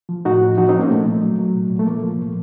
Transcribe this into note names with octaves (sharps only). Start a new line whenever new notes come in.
F3
A2 D#4 F#4
A2
F3 D#4 F#4
F3 C4 D#4
A#3 C#4
A#2 A3
A#2
F#3
F#3
A#2
A#2
A3
F3 A#3
F3
A#2